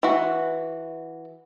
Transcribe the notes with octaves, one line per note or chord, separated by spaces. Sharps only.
E3 F#4